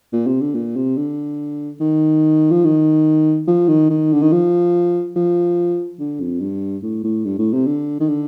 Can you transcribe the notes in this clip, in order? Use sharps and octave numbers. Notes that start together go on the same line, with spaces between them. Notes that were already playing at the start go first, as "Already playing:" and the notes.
A#2
C3
D3
A#2
C3
D3
D#3
F3
D#3
F3
D#3
D#3
D3
D#3
F3
F3
D3
F2
G2
A2
A2
G2
A2
C3
D3
D#3
D3